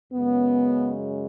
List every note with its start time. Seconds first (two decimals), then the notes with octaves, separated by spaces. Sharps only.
0.13 F#2 C#3 G#3 B3